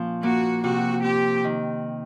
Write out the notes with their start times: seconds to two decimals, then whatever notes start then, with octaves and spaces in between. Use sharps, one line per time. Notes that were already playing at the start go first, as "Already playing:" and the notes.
Already playing: A#2 F3 C#4
0.23 A#3 F#4
0.63 C3 F#4
1.04 C4 G4
1.44 D#3